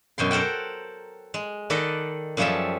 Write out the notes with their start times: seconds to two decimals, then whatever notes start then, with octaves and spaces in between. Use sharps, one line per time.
0.18 F#2 B2 G5 C6
0.31 A4 A#4 C5 F#5 G5
1.34 G#3
1.70 D#3 A4 D5 D#5 F#5 B5
2.37 F#2 F3 G3 G#4 A4 E5